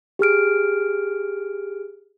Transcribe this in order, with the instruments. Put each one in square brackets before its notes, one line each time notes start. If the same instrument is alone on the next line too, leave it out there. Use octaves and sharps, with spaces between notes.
[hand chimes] G4 G#4 F6 D7